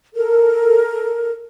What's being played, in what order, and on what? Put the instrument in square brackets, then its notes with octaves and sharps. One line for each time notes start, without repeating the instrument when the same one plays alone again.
[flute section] A4 A#4